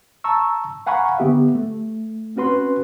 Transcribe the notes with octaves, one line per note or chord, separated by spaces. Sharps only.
A5 A#5 C#6 E6
F5 F#5 G#5 A#5 B5 C#6
D3 B3 G4 E5
A3
C4 C#4 F#4 B4 C6